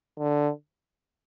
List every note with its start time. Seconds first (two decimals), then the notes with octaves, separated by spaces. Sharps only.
0.18 D3